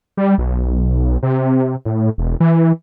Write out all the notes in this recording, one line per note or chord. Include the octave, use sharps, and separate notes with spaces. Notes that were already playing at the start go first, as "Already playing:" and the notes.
G3
B1
C3
A2
E1
E3